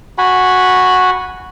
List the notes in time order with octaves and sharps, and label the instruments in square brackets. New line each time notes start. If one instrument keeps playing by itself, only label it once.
[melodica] F#4 F#5 G#5 B5